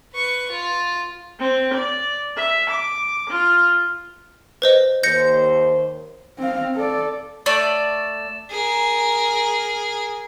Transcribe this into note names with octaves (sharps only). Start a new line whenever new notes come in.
B4 C#6
F4
C4
D5
E5
D6
F4
B4 C5 D#5
D#2 C5 G6 A#6 C#7
C4 F5
A4 D5
A3 D5 A6 E7
G#4 A#4